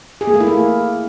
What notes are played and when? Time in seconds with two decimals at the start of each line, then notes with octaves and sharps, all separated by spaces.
0.21 G#4
0.27 A#3
0.34 A3
0.40 E4
0.47 A#3